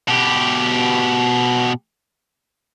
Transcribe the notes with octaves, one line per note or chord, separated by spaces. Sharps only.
B2 G4